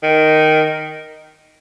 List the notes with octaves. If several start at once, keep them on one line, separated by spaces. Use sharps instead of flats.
D#3